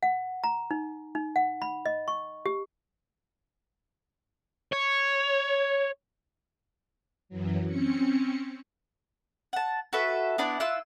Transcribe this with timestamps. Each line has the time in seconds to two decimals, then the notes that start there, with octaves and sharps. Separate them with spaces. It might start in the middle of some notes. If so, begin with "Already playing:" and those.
0.03 F#5
0.44 A#5
0.71 D#4
1.15 D#4
1.36 F#5
1.62 B5
1.86 D#5
2.08 C#6
2.46 G4
4.73 C#5
7.29 F#2 E3 F#3
7.67 C4 C#4 C#7
9.53 F#5 A5
9.93 F#4 A4 B4 E5
10.38 B3 D4 E4 D5
10.60 E4 F4 E6 F#6